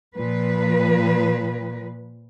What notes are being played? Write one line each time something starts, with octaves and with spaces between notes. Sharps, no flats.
A#2 F3 B4